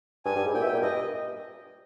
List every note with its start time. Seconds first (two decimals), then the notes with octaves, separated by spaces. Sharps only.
0.25 G2 G#5
0.36 G2
0.44 G#2
0.54 A#2 G5
0.61 B2 E5
0.68 G5
0.73 A#2
0.82 G2 D#5